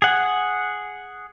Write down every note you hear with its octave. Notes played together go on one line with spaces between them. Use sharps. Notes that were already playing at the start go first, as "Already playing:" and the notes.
G#4 F#5